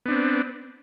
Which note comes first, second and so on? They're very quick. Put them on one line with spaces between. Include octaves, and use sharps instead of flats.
B3 D4 C4